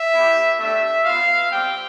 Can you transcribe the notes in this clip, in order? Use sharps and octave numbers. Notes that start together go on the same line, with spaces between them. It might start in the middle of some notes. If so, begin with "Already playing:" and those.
Already playing: E5
B3 E4 G4
A3 D4 G4 E5
B3 F4 F5
G3 C4 G4 G5